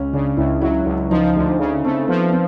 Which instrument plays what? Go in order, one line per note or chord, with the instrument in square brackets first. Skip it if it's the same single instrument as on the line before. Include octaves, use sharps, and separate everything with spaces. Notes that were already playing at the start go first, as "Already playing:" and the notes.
Already playing: [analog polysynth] C#2 [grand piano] C#4
[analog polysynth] C#3 [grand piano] D4
[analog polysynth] C#2 [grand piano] E4
[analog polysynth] F#3 [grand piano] E4
[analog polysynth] C#2 [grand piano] E4
[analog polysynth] F3 [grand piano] D#4
[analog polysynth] D2
[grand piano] D4
[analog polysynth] C#3
[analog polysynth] A3 [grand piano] C4
[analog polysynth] F3 [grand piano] B3
[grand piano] C4